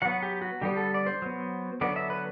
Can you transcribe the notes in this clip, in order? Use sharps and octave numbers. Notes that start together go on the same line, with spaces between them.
F#3 B3 F#5
G4
F#4
D3 G3 B3 G4
A4
D5
C5
F#3 B3
D3 F#3 B3 D5
E5
B4